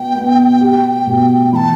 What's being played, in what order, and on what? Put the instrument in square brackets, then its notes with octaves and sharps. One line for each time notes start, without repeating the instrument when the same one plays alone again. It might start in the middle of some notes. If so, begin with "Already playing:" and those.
Already playing: [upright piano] B2 B3 [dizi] G5
[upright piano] B3
G4
B2
[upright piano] E3 [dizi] A5 B5